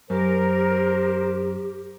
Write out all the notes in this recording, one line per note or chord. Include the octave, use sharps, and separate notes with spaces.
F#2 G4 A#4 C5